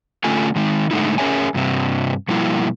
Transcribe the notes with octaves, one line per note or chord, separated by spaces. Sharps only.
D3 A3 C#4 F4 A4 G#5
D#3 G#3 D#4
A2 D3 G#3 A3 D#4 E4
C#4 G#4 A#4 C#5 E5 G#5
G2 C3 C4
B2 F3 G3 A#3 E4